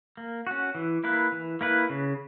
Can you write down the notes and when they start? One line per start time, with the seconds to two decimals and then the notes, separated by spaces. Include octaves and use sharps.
0.17 A#3
0.47 C#4 F#4
0.75 E3
1.04 A#3 E4 B4
1.32 E3
1.61 A#3 E4 B4
1.90 C#3